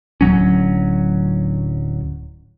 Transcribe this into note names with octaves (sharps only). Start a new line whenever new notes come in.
D1 G2 F#3 C#4